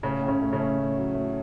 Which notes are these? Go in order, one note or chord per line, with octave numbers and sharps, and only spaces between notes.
A2 C#3 C#4
A2
C#3 C#4
A3
C#3 C#4
A3
A2
F#3
A3